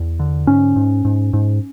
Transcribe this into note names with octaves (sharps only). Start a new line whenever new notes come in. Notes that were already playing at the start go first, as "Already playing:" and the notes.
Already playing: E2
D3
G#2 C#4
G#2
G#2
G#2